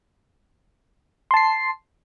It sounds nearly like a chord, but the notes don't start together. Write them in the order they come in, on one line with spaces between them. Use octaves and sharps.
C6 A5 C7